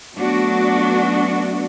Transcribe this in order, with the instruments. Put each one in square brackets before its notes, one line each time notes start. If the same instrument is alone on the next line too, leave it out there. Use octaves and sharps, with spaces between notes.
[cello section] F#3 A3 B3 D4 F#4